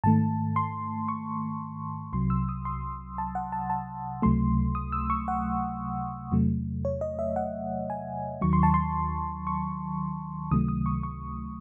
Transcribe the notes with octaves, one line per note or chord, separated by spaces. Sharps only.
G#2 D#3 A3 A5
C6
C#6
C2 C3 F#3 C6
E6
D#6
C6
A5
F#5
A5
A5
C#2 C3 F#3 A3 C6
D#6
E6
C#6
F#5
E2 C3 F#3 A3
C#5
D#5
E5
F#5
G#5
D#2 D#3 F#3 C#6
C6
A5
C6
C#6
C#2 C3 D#3 F#3 A3 D#6
D#6
C#6
C#6